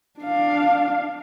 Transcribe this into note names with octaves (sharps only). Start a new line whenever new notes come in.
D4 F5